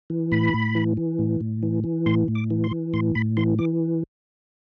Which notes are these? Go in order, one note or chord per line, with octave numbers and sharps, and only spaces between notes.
E3
A2 B5
A2
E3
E3
A2
A2
E3
E3
A2 C6
A2
D6
E3
C6
E3
A2 C6
A2 B5
E3 C6
E3 D6